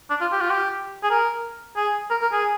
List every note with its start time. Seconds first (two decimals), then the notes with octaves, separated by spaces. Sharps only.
0.10 D4
0.21 F4
0.32 G4
0.41 F4
0.50 G4
1.03 G#4
1.10 A#4
1.77 G#4
2.10 A#4
2.21 A#4
2.32 G#4